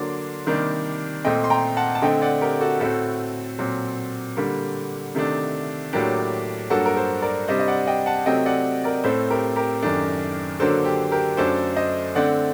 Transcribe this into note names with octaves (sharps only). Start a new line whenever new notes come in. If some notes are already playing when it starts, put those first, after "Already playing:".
Already playing: D3 F#3 A#3 D4 C6
C3 D#3 G3 A#3 D4
A#2 A3 C4 D#5 G5
C6
G5 A#5
F#5 A5
A5
D3 A3 C4 D#5 G5
D5 F#5
G4 A#4
F#4 A4
A2 A3 C4 F#4 A4
A#2 F#3 C4
D3 G3 A#3
C3 D#3 A3 D4
A2 F#3 A#3 D4 G4
G2 F#3 A#3 F#4 A4
A#4
A4 C5
A#4 D5
C3 G3 D4 C5 D#5
D#5
D5 F#5
D#5 G5
F#5 A5
C3 F#3 A3 C4 D#5 G5
D5 F#5
A#4 D5
A2 A3 C4 A4 C5
G4 A#4
G4 A#4
F#2 D#3 A3 D4
D3 F#3 A#3 D4 A4 C5
G4
G4 A#4
F#2 F#3 A3 D4 A4 C5
C5 D#5
D3 A3 C4 D5 F#5